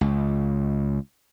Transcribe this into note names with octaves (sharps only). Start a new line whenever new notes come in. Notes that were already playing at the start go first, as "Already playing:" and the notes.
C#2